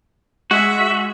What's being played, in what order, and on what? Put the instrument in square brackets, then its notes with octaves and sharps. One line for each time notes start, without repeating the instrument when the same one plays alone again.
[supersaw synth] G#3 [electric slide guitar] F#4 [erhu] E5